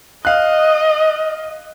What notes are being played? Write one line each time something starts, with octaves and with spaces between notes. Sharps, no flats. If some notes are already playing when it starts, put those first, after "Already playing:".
D#5 F5 F#6